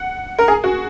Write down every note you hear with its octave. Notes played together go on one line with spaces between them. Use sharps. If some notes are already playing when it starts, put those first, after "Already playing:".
Already playing: F#5
A#4
G#4
F#4